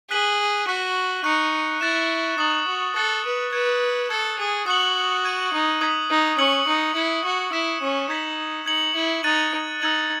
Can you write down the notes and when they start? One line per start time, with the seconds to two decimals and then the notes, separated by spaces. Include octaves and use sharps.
0.10 G#4 F#6 B6 D#7 F#7
0.67 F#4 C#6 F#6 B6
1.24 D#4 C#6 F#6 C#7
1.81 E4 F#6 A6 E7
2.38 D#4 D#6 A6 C#7 F#7
2.67 F#4
2.96 A4 F#6 A6 C#7 F#7
3.25 B4
3.53 B4 C#6 G#6 C#7 E7
4.10 A4 E6 G#6 C#7
4.38 G#4
4.66 F#4 D#6 F#6 C#7 F#7
5.25 C#6 G#6 D#7
5.53 D#4
5.81 D#6 G#6 B6 F#7
6.10 D#4
6.38 C#4 C#6 E6 G#6 C#7 F#7
6.67 D#4
6.95 E4 G#6 C#7 F#7
7.24 F#4
7.52 E4 E6 B6 E7
7.81 C#4
8.10 D#4 G#6 B6 F#7
8.66 D#4 G#6 C#7 F#7
8.95 E4
9.23 D#4 F#6 A6 D#7 F#7
9.81 D#4 E6 G#6 D#7 F#7